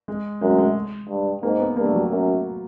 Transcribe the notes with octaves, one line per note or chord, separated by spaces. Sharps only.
G#3
F#2 G#3
A3
G#3
G2
G#2 A#3
B3
G2 A#3
A3
F#3
F#2